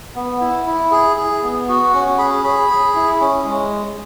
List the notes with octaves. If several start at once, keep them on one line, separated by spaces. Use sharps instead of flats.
B3
E4
E4
G#4
G#4
B3
F#4
C#4 F#5
G#4 B5
G#4 B5
G#4
E4
C#4
G#3